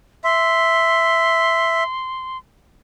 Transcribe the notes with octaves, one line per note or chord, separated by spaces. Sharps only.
E5 C6